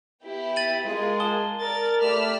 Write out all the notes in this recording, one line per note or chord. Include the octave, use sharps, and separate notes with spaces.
B3 E4 G4
A6 D#7 F#7
G#3 F4 G#4 A#4
A5 D#6 G7
A#4 D5 A6
A3 G4 D5 B5 E6 F6